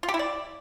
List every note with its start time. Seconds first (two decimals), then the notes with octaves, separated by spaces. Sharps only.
0.03 F4
0.08 G4
0.14 E4
0.19 D5